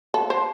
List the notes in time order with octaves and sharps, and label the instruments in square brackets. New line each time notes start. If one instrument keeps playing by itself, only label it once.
[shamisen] A4
C5